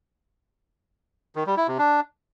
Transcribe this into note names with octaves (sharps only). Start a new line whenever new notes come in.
D#3
G3
E4
C3
D4